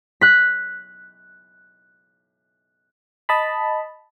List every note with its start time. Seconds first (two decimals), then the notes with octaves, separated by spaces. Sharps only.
0.21 F#6 B6
3.29 D#5 A5 B5